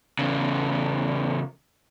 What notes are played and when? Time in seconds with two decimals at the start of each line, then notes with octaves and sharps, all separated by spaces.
0.19 E2 C#3